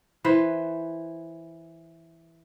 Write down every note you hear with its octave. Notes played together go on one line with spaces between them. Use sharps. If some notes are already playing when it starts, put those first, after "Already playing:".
E3 B4 C5